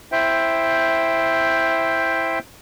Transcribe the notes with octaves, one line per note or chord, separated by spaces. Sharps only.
E4 C5 E5 G5